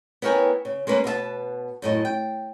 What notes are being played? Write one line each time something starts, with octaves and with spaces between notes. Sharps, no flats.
B3 E4 A#4 C#5 G5 G#5
C#3
G#3 A#3 C#4 B4
B2 B3 D#5 A5
F#2 A2 D#5
G5